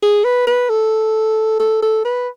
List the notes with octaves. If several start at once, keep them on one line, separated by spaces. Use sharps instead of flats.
G#4
B4
B4
A4
A4
A4
B4